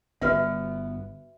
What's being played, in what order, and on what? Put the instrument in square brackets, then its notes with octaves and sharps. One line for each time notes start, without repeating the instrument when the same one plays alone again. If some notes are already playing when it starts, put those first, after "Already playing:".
[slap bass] G1 B3 [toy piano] F#4 B4 E5